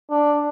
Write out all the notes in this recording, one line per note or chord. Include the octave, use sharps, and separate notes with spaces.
D4